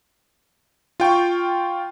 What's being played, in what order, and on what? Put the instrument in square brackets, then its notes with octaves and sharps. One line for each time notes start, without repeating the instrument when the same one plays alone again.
[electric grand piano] F4 G5 C#6